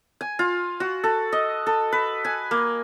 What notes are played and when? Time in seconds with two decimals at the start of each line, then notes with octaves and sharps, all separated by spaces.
0.21 G#5
0.39 F4
0.80 F#4
1.04 A4
1.32 D#5
1.66 A4
1.92 B4
2.25 G#5
2.51 A#3